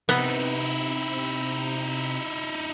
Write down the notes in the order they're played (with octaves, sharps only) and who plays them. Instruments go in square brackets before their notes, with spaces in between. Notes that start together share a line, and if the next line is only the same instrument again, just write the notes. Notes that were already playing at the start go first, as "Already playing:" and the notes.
[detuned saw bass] C3 [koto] B3 [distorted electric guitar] D#4 E4